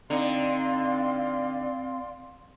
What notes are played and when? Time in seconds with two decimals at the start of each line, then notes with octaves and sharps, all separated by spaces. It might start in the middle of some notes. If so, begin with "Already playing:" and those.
0.10 D3 C4 D#4 D5 F5 C6